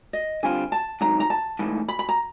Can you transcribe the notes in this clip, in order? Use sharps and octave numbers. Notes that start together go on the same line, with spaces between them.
D#5
D3 G3 C4 F4 G#5
A5
G#2 D#3 F#3 A#5
A#5
A5
G#2 E3 A3
B5
B5
A#5